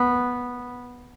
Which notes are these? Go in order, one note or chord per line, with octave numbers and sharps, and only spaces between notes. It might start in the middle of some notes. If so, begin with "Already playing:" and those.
Already playing: B3